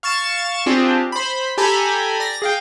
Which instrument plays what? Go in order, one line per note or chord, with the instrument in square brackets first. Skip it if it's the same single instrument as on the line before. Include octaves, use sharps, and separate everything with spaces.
[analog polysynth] F5 C#6 A6 E7
C4 D4 F4 G4 G#4
C5 B5
G4 A4 G#5 A#5 B5
D5 A#6
G#4 F5 G5